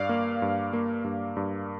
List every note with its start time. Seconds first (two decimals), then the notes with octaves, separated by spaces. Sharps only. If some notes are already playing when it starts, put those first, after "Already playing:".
Already playing: G2 D5 F5
0.09 A#3
0.42 G2
0.73 A#3
1.04 G2
1.37 G2